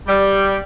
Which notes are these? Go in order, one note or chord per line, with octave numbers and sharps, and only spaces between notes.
G3